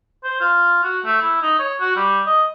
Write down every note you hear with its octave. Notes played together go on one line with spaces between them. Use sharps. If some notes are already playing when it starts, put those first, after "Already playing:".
C5
F4
F#4
A3
E4
D#4
C#5
F#4
G3
D#5